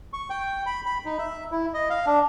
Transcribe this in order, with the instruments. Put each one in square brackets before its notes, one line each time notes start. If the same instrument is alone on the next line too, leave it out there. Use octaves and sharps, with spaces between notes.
[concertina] C#6
G5
B5
B5
D#4
E5
E4
D#5
F5
D4